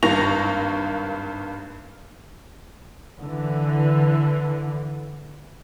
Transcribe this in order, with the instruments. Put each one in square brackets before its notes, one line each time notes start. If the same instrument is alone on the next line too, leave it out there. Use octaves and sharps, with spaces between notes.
[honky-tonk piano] G#1 G2 A#3 C#6 A#6 F7
[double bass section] D3 E3